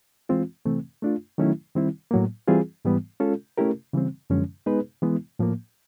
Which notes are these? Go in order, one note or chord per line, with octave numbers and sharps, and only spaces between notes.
E3 G#3 C4 F4
C3 E3 A3 C4
A3 D4 F4
D#3 F#3 A3 C#4 E4
D#3 G3 C4 E4
A2 F#3 A#3
E3 G3 C4 F4 G#4
G#2 E3 G3 B3
G#3 C#4 F4 A4
A3 C#4 E4 G4 A#4
C#3 E3 G3 C4
F#2 D3 F3 G#3 C#4
G#3 B3 D#4 G#4 B4
E3 G#3 B3 E4
A2 F3 A#3